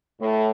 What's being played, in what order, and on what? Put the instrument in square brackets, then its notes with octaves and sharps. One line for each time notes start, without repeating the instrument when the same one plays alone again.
[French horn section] A2